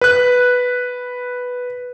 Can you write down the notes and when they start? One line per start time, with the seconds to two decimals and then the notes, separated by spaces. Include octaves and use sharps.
0.01 B4 F#6